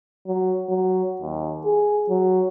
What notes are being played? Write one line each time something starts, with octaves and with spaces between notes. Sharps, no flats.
F#3
F#3
D#2
G#4
F#3